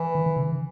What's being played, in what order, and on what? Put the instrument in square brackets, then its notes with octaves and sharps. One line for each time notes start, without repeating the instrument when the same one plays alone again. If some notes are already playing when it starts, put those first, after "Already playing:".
Already playing: [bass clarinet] E3
[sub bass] D#3
D#3
C#3